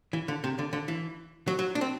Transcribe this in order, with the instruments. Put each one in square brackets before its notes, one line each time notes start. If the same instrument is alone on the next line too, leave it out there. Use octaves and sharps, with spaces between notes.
[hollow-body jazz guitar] E3
D3
C3
D3
D3
E3
F#3
F#3
D4
C4